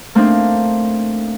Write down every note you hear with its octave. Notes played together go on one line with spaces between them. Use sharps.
A3 A#3 C4 D4 D#4